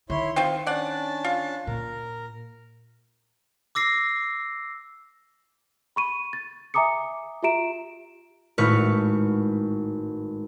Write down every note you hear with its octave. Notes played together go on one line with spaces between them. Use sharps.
D#3 E4 C#5 C6
C4 F4 C5 C#6
C#4 D4 D5 F#5 A5
F4
A#2 A#4
D6 E6 A#6 C7
B5 C#6 D#7
A6
E5 G#5 A#5 D6 D#6 C#7
F4 G4 E5 A#5 D7 E7
G#1 A2 B4 C#6 F6